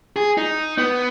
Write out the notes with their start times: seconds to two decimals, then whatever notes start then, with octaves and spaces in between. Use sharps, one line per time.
0.16 G#4
0.38 D#4
0.78 B3